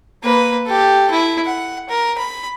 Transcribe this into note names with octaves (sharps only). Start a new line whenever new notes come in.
A#3 B4
G4 A4
E4
F#5
A#4
B5